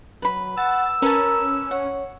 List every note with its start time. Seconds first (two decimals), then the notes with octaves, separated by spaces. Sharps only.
0.22 F#3 B4 B5
0.58 F#5 A5 E6
1.02 C#4 A#4 B4 A5
1.71 C#5 F#5